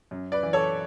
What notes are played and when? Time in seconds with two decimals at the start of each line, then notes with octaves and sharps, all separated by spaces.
0.11 F#2
0.32 B4 D5
0.43 E3
0.53 A4 C#5